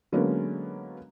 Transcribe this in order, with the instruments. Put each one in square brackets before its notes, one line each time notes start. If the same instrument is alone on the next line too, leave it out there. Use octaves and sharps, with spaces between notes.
[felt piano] D3 F#3 G#3 A#3 B3 C#4